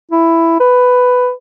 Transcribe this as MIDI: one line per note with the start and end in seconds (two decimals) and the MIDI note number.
0.11 0.59 64
0.60 1.31 71